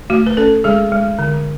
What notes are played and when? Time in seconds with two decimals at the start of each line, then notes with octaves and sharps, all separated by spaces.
0.10 A3 F#4
0.27 B4
0.37 C#4 A4
0.64 G#3 G#4
0.92 G#3
1.19 D3